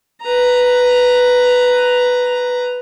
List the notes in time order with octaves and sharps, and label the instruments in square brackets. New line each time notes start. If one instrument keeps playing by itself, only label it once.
[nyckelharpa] B4 A#5